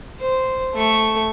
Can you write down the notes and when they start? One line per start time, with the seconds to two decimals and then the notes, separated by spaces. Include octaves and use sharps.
0.20 C5
0.74 A3 C#6